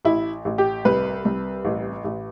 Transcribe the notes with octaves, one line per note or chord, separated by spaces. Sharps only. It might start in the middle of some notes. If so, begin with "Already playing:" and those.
A1 E4
A1
G4
C2 B4
C2
A1
A1